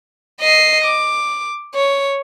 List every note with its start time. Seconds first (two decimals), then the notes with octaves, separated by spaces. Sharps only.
0.41 D#5 C7
0.84 D6
1.75 C#5